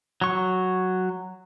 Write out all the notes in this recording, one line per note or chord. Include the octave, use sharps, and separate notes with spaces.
F#3 C#6